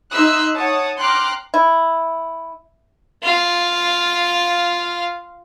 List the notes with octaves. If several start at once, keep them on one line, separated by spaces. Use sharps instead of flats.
D#4 E5 C6 E6 F#6
C#5 F#5 A5 D#6
G5 A#5 C6 D6 F6 F#6
E4
F4 F5